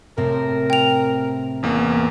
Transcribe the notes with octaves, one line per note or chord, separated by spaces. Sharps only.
A2 C3 C4 A#4
G5 F7
A1 E2 A#3